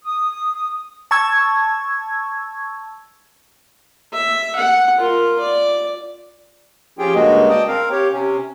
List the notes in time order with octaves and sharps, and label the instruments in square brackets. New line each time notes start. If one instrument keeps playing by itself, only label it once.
[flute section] D#6
[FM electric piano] A5 C#6 E6 G#6
[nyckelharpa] E5
F#5
F4 A#4
D5
[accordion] F3 C#4 F4 G4 G#4 G5
G2 C#3 G#3 A#3 F#4 D#5
D5 D#5 G5 A5 D#6
C4 A#4 F5
G4 C#5
C3 C#4